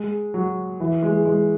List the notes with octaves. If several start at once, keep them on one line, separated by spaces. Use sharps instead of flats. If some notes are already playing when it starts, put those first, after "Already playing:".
Already playing: G#3
F#3
E3
G#3
G#3